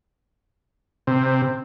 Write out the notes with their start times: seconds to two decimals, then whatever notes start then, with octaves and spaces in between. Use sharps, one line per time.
1.07 C3